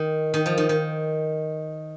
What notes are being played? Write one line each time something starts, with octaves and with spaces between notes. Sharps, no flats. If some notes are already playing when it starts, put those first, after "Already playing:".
Already playing: D#3
D#3
F3
D#3
D#3